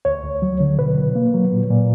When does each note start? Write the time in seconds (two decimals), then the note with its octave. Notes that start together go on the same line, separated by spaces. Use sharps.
0.05 D2 C#5
0.24 D2
0.42 F#3
0.60 D3
0.79 B2 B4
0.97 B2
1.15 A#3
1.34 F#3
1.52 A#2
1.71 A#2